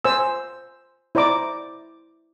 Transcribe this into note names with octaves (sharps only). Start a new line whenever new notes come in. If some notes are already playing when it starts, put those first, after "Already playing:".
C5 G#5 E6
E4 C5 D5 A#5 D6